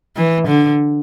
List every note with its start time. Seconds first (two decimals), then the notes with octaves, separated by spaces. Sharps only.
0.16 E3
0.47 D3